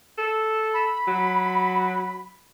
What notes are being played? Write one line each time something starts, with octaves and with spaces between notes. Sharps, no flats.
A4
B5
F#3